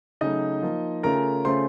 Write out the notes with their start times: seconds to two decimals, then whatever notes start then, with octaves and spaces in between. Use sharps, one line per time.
0.21 C#3 F#3 A3 D#4 D#5
0.62 F3 A#3 F4
1.03 C#3 A3 C#4 F4 A#4 A#5
1.45 C#3 A3 C#4 F4 C5 C6